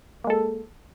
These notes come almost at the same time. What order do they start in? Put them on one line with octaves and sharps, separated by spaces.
A#3 G#3 A4